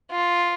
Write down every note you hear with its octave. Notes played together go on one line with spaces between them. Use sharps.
F4